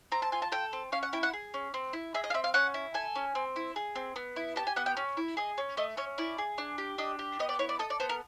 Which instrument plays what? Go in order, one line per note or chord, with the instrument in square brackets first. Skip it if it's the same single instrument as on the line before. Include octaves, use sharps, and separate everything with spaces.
[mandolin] C4 A#5
A5
F4 G#5
A5
A4 G5
C4
C#4 F5
F#5
E4 G5
F#5
G#4
C#4
C4
E4
G#4 E5
D#5
F5
C4 E5
F5
C#4 F#5
E4
A4 G#5
C#4
C4
E4
G#4
C4
B3
E4
G4 A5
G#5
B3 F#5
G5
C#4
E4
G#4 D#5
C#4
A3 D#5
C#4 C#5
E4 D5
G#4
D4
G4
D4 D#5
G4
B3 D#5
D5
E4 C#5
D5
A4 D#5
D5
B3 C5
A#4